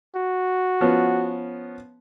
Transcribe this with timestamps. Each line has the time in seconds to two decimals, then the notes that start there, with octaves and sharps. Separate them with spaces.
0.16 F#4
0.81 F3 B3 C#4